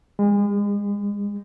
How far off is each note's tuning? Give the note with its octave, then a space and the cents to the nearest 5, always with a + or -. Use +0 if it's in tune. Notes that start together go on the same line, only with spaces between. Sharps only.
G#3 -35